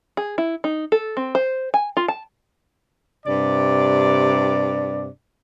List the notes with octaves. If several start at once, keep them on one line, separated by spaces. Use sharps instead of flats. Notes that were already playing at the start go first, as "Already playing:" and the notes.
G#4
E4
D#4
A4
C4
C5
G#5
F4
A5
G2 C3 D4 D5